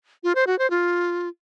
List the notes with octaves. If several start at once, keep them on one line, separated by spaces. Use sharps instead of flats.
F4
C5
F#4
C5
F4